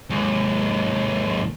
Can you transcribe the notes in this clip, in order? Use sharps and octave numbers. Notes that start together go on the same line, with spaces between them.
D#2 G#2